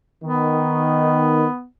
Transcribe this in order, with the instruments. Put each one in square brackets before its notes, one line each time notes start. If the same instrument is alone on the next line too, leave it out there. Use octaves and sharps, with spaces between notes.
[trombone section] D#3 [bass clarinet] B3